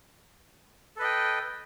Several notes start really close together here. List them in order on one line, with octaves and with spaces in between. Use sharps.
A4 B4 D#5 G5